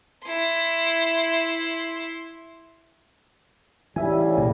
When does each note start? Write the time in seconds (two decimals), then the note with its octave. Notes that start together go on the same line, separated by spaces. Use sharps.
0.25 E4 C6
3.96 A2 C#3 E3 G3 D#4 E5 G#5
4.37 C2 A#2